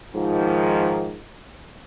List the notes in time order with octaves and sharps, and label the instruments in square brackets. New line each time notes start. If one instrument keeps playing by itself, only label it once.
[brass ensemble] G#2 D#3 F3